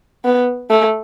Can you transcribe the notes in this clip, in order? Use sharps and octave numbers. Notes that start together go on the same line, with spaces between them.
B3
A3